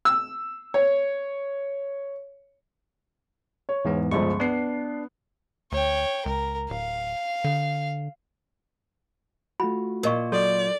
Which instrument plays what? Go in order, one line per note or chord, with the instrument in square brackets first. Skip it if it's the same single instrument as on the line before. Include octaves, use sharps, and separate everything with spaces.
[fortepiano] E6
C#5
[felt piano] C#5
[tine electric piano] E2 G#2 B3
[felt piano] G1 C#2 F3 [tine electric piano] C#6
[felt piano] B3 C7 [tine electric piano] D4
[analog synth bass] D2 [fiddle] C#5 G5
[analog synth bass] C#2 [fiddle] A#4
[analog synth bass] D1 [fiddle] F5
[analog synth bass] D3
[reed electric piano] A3 F4 F#4 [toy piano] B5
[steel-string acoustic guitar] A#2 [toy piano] A#4 D#5 C#6
[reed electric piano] F#3 C6 G6 [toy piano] A4 [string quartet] D5